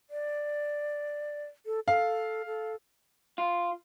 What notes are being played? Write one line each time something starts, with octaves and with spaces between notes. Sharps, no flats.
D5
A4
A4 F5
A4
F4